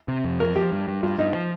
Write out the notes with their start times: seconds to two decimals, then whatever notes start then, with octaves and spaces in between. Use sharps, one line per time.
0.08 C3
0.25 F2
0.40 F3 A#4
0.56 F3 G4
0.72 G2
0.88 G2
1.03 G2 F4
1.18 G2 D#4
1.34 F3